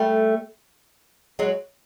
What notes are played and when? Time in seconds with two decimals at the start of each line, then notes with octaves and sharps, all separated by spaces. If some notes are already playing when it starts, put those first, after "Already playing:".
Already playing: G3 A3
1.39 F#3 G#3